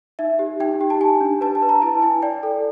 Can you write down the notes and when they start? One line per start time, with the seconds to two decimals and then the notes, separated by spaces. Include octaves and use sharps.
0.19 D#4 E5
0.39 G4
0.60 D#4 G5
0.81 G4
0.90 A5
1.01 G4 G#5
1.21 D4
1.41 B4 A5
1.55 A5
1.62 B4
1.69 A#5
1.82 E4 A5
2.02 E4 G#5
2.22 D5 G5
2.43 A4